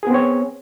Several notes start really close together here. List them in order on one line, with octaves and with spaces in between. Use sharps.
G#4 B3 C4 C#5